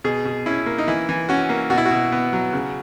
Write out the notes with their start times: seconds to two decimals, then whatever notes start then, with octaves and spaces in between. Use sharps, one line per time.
0.04 B2 G#4
0.25 B2
0.46 C#4 E4
0.66 A#3
0.78 D#4
0.87 E3 E4
1.09 E3
1.29 C#4 F#4
1.49 A#3
1.70 B2 F#4
1.78 E4
1.86 F#4
1.91 B2
2.12 B3
2.33 F#3
2.53 C#3